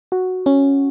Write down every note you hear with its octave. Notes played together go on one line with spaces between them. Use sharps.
F#4
C#4